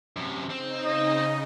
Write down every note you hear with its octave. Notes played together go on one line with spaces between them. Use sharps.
F#2 C3
C#3 C4 D#4
D#5